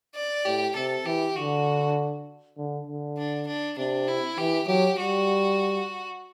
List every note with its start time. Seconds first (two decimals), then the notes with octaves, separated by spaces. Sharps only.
0.15 D5
0.45 A2 G4
0.76 C3 A4
1.06 E3 G4
1.36 D3 F#4
2.57 D3
2.87 D3
3.18 D4
3.47 D4
3.78 C3 D4
4.08 E4
4.38 E3 G4
4.67 F#3 G4
4.98 G3 F#4